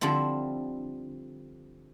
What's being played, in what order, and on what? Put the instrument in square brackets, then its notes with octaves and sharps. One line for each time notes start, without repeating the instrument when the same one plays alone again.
[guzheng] D3 F3 G3 C4 E4